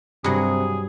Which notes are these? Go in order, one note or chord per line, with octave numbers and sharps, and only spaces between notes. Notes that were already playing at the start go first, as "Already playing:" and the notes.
G2 C3 F#3 G#4